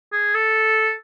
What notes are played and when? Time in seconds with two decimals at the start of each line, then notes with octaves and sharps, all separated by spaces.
0.13 G#4
0.35 A4